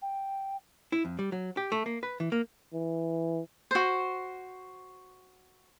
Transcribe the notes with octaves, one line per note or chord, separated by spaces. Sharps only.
G5
E4
F2
G3
F#3
G4
A3
A#3
B4
E3
A#3
E3
F#4 C5